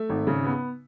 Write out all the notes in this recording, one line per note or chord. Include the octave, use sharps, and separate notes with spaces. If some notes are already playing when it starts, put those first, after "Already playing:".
Already playing: A3 E5
G#1
C#3
B3